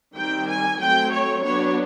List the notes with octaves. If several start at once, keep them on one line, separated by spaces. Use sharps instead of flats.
D#3 G3 C4 G5
G#5
F#3 A3 C4 G5
C#5
F#3 B3 D4 C#5